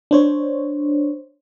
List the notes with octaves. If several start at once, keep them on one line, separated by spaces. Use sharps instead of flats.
D4 C5 C#5